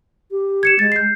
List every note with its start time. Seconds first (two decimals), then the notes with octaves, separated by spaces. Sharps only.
0.31 G4
0.63 G#6 C#7 E7
0.79 G#3 A6
0.92 G6 C7